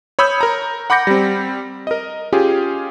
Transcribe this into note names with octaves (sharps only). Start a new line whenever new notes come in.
C#5 B5 D#6 E6 G6
A#4 A#5
F#5 B5 D6 G6 A#6 C#7
G3 C4
A#4 D#5
C#4 F4 G4 G#4